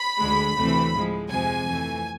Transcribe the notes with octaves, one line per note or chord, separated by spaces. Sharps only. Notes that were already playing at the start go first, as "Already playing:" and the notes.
Already playing: B5
D2 D3 G#3
D2 C3 E3 A3 C4
A2 F3 G#3
F2 C3 F3 G#3 G#5
F2 E3 A3